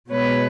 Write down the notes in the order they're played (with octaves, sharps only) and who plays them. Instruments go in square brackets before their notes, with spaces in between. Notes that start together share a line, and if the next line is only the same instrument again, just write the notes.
[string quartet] B2 G#3 B3 B4 C#5